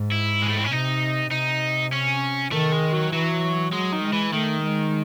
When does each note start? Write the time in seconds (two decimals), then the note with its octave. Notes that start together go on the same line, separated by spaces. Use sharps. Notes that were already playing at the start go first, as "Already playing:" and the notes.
Already playing: G#2
0.12 E4
0.42 G#3
0.50 A3
0.58 C4
0.64 C#4
0.71 C3 D#4
1.31 C3 D#4
1.92 C#4
2.52 D#3 A3
2.72 G#3
2.93 F#3
3.13 E3 F#3
3.72 F#3 G#3
3.93 D#3
4.02 G#3
4.13 E3
4.33 D#3 A3
4.63 G#3